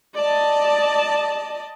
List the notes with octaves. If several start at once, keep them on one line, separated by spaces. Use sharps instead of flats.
D5 D#5 A5